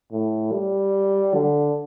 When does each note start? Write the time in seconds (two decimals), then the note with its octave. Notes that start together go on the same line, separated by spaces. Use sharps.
0.12 A2
0.52 G3
1.34 D3